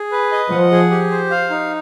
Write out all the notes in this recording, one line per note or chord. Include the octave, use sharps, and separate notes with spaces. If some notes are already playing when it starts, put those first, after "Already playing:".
Already playing: G#4
B4
D#5
F3 F#5
G#4
G4
C5
F5
D#4